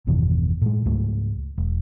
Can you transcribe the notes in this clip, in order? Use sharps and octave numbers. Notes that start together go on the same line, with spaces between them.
G1 E2 B2 D#3
A2 G#3
C#2 G#2 A3
E1